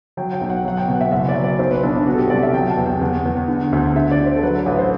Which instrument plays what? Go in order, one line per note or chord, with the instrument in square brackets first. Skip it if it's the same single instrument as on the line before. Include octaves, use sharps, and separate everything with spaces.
[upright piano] F#3 G5
G5
B1
F#5
F#3 F#5
G5
B2 F#5
E5
F#1 E5
D5
F#3
D5
B1 C5
B4
B1 D4
D4
B2 F#4
A4
G4
C2 D5
E5
F#3 G5
A5
E2
G5
E2 F#5
E2
D3
D2
D3 E5
D5
D3
C5
A4
F#3 B4
A4
A1 B4
C5